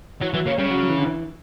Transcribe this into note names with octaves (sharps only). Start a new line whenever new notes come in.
E3 F#3
E3 F#3
C#3 A#3
C#3 G3
F#3
F#3
E3
D3
E3